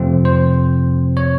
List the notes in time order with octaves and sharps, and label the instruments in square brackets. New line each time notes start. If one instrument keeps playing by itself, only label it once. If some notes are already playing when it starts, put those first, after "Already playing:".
Already playing: [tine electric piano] F2 C3 F3 A3 C4
C5
C#5